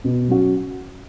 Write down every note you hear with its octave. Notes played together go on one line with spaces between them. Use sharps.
B2
F#3 C#4 F#4